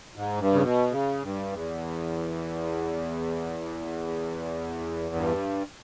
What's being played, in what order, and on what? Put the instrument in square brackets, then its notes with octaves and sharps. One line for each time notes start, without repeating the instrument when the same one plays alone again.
[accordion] G#2
G2
C#3
B2
C#3
G2
E2
G2